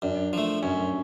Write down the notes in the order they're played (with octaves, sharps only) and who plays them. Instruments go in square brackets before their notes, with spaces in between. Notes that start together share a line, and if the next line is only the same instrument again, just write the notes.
[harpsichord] F#2 [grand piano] D4
[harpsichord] F3 A3
[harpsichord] F#2 [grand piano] C#4